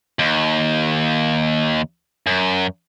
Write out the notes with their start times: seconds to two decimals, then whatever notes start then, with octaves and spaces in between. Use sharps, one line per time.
0.19 D#2
2.27 F#2